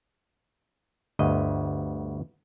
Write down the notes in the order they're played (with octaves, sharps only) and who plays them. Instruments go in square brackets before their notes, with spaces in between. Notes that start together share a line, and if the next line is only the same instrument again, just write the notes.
[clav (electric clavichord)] G1 D2 D#5